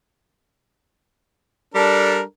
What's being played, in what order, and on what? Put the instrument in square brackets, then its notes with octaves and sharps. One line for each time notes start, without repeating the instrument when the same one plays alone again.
[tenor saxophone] G3 [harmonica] D4 A4 A#4